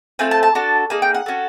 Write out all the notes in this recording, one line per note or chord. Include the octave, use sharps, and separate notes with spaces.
A3 C4 F4 A4 G#5
A5
A5
D4 F#4 A4
A#3 D#4 G#4 G#5
G5
F#5
C#4 F#4 A4